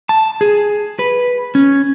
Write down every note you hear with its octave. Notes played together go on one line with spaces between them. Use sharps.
A5
G#4
B4
C#4